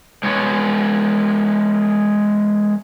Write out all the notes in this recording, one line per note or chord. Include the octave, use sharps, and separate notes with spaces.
G#3 B3 C#5